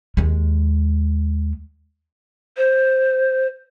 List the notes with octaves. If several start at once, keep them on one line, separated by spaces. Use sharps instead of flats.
D#2 G#3
C5